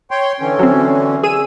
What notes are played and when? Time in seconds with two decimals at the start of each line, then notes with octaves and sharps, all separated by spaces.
0.11 C#5 G5 C6
0.40 D3 E3 C#4
0.59 F#3 C4
1.23 G#4 E6 D#7